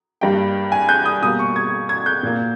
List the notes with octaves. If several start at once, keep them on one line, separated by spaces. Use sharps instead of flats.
G2 G3 A#3 G5
G#5
G6
D#6
B2 G3 A#3 D#6
C#6
G#6
G#6
G6
A#2 A#3